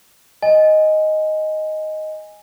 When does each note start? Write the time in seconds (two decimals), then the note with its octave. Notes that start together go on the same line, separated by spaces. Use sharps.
0.43 D#5 G#5